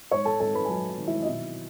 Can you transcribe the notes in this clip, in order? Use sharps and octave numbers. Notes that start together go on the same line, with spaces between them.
G#2 C#5 C#6
A4 A5
G#1 A4 A5
B4 B5
G#5
F#3 A4 A5
D#3
E4 E5
D#5
B2 E4 E5